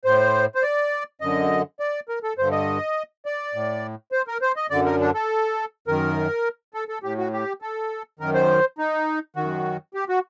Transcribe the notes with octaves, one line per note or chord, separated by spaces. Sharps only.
A2 C5
C5
D5
F#2 D3 D#5
D5
A#4
A4
G2 D3 C5
D#5
D5
A2
C5
A#4
C5
D#5
F#2 D3 D5
A#4
D4
A4
F#2 D#3 A#4
A4
A4
A2 G4
F#4
G4
A4
F#2 D#3 A#4
C5
D#4
F#2 D#3 F#4
G4
F#4